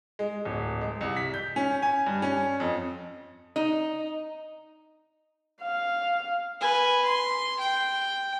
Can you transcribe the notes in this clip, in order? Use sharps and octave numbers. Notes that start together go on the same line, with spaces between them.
G#3
D1
G#3
C2
B6
G6
C#4
G#5
G2
C#4
F2
D#4
F5
B4 G#5
C6
G5